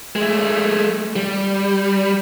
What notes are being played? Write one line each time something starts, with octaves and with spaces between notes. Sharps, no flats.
G#3 A3
G3